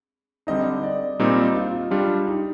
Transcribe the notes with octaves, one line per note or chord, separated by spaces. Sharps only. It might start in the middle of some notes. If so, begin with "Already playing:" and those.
D3 G3 C4 D#4 D#5
D5
A#2 G3 C4 D#4
F4
G3 D4 F4 G4
D#4